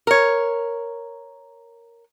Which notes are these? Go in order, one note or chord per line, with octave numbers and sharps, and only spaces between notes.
A#4 C#5